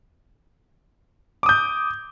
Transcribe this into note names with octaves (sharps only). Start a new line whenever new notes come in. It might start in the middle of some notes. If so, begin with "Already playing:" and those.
D6 D#6 G6